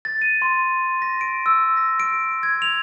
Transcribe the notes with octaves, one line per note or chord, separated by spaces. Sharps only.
A6
D#7
C6
A#6
D7
E6
A#6
D7
G#6
F7